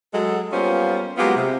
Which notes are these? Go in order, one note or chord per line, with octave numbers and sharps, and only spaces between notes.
F#3 G#3 A4
G3 A#3 B3 C#4 F4 C5
F#3 G#3 A#3 B3 F4 G4
C3